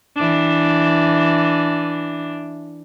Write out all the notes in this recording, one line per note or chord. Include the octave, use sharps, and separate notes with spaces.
E3 D4